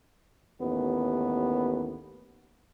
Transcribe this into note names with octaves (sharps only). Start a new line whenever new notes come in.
A1 D#2 B3